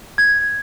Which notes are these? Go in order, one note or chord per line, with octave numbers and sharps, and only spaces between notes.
G#6